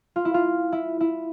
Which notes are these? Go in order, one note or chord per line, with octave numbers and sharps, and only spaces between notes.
F4
E4
F4
E4
E4